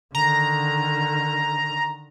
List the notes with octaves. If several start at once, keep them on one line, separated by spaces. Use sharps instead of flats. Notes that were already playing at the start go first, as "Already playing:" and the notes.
D3 D#3 A#5